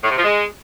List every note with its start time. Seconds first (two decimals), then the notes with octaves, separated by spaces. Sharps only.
0.03 A2
0.10 C3
0.17 F3
0.24 G#3